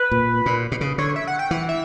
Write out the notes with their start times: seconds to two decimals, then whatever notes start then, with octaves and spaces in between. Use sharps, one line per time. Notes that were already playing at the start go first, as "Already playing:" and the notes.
Already playing: B4
0.11 A#2
0.46 A#2
0.72 B2
0.81 C#3
0.98 D3 C#5
1.16 E5
1.27 F#5
1.39 G5
1.51 E3 F#5
1.69 E5